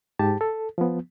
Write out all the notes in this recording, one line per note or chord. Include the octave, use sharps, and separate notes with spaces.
G#2 G4 A5
A4
F3 B3